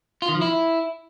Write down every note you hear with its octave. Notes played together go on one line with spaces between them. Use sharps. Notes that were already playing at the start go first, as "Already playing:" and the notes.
F4
D#3
F3
E4